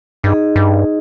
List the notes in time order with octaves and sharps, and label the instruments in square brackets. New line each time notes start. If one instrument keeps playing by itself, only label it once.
[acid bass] G2 [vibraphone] D#4 G#4 D#5
[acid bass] G2